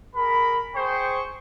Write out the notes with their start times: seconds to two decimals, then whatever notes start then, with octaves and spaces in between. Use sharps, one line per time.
0.15 G#4 A#4 B5
0.76 G#4 C5 G5 C#6